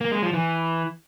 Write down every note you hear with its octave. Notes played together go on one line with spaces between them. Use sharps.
A#3
G#3
F3
E3